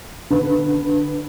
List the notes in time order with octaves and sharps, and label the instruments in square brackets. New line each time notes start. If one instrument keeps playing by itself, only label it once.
[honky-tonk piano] D3 B4